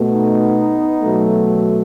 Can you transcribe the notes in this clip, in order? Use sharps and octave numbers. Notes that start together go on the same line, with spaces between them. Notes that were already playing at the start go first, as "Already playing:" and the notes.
Already playing: B2 A3
B3 D#4
B2 F#3 A3